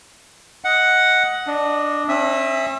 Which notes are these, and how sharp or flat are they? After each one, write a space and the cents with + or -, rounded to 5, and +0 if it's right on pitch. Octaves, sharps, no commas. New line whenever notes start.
D#5 +15 F#5 +0
D4 +0 D#5 -20
C#4 -45 E5 +0 D#6 +35